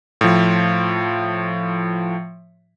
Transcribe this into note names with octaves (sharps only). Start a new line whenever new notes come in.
A2 F3